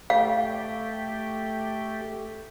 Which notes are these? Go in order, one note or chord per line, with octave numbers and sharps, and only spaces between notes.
A3 G4 F5